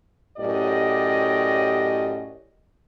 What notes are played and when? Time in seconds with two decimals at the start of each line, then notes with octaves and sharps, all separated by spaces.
0.38 F#2 A2 G4 D5 D#5